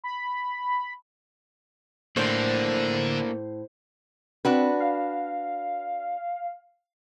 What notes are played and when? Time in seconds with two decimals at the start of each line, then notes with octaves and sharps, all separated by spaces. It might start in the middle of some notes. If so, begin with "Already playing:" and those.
0.04 B5
2.17 A2 D3 A#3 D4 C5
4.45 C4 D4 F#4 B4
4.80 F5